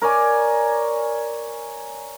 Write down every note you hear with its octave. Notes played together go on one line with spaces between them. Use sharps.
A#4 C#5 D5 G#5